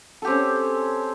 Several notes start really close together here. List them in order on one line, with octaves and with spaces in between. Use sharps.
A4 G4 C4 C#4